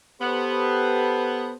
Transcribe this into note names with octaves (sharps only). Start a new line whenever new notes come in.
B3 G4 A4 C5